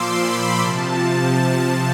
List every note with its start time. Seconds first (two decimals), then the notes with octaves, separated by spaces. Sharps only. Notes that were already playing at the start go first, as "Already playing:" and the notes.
Already playing: A#2 F3 C6 D6 E6
0.17 B5
0.60 C3 F3 A5